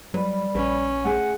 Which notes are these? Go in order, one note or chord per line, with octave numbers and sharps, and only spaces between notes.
F#3 G3 B4
A#1 C#4 B4
A3 G#4 F#5 G#5